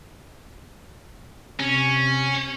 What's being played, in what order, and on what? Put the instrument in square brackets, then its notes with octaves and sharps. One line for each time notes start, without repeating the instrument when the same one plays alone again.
[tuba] C3 [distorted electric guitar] C#4